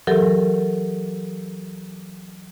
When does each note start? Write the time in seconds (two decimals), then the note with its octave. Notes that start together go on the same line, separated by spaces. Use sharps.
0.07 E3 F#3 G4 A4 A#4